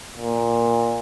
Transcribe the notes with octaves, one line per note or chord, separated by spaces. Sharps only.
A#2